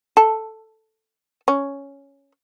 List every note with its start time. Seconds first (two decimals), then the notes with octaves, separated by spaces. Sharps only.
0.17 A4
1.48 C#4